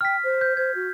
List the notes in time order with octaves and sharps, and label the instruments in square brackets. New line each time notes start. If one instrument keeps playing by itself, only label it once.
[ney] G5 [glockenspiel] F6 B6
[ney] C5
[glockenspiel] G6
[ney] C5 [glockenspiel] G#6
[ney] F#4